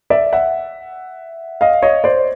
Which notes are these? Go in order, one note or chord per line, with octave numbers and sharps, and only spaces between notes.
D5 E5
E5 F#5
D#5 F5
C#5 D#5
C5 D5